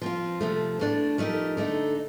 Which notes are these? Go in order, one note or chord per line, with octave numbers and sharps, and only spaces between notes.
F3 C4 F4
C3 F3 A3
A2 A3 D4
F3 A3 D#4 G4 A#4
D3 A3 D#4 A4